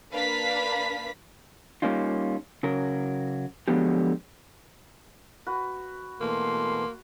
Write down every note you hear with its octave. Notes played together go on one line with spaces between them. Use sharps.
A#3 D4 B4 F5 B5 B6
G3 A#3 C#4 D#4 F4
C#3 F#3 A#4
D3 F3 F#3 G#3 B3 G4
F#4 B4
B2 E3 A3 A#3 C6